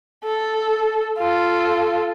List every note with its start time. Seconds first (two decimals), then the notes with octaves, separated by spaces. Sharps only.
0.24 A4
1.19 F4 A4